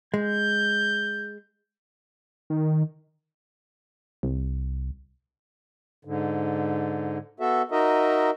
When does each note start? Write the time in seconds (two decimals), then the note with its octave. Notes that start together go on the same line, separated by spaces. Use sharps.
0.14 G#3 G6
2.50 D#3
4.23 C2
6.05 G#2 D3
7.40 B3 F#4 A4 E5
7.71 D#4 F#4 A#4 D#5 E5